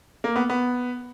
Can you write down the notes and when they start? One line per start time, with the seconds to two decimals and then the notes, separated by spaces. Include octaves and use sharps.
0.24 A#3
0.36 B3
0.50 B3